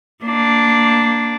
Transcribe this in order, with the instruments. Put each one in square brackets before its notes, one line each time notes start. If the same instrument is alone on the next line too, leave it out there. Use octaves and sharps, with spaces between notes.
[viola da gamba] A#3 D4